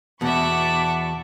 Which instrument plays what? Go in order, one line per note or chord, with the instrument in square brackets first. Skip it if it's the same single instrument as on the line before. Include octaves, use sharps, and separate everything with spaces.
[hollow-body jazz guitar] E2 B2 [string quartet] D5 B5 C#6 [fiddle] E5 F#5 [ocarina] A5